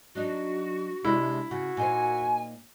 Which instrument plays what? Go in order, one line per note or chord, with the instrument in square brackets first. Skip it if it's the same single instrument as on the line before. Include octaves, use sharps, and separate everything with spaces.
[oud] F#3 D4 D#4 [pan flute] F#4
[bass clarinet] C3 [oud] G#3 D4 [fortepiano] E4
[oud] C#3 [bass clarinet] F#4
[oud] A#2 D#4 C5 [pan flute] G#5